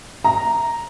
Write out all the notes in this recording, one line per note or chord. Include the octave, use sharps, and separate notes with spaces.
A#5